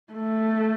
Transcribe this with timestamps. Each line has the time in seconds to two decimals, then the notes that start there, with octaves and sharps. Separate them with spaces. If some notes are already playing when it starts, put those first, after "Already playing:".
0.13 A3